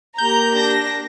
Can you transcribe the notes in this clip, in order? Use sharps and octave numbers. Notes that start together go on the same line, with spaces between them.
A#3 G4 A#5 G6
D4 A#6